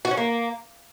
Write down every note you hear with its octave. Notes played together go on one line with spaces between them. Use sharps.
F#4
C#4
A#3